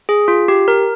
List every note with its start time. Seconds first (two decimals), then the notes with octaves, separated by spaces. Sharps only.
0.09 G#4
0.28 F4
0.48 G4
0.68 A#4